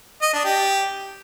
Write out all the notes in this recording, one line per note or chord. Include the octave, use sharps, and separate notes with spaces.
D#5
D4
G4